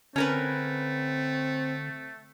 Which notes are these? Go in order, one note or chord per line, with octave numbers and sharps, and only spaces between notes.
D3 A3 C4 C#4 A#4 B4